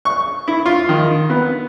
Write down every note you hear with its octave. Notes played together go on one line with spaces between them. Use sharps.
C#6
E4
F4
D#3
B3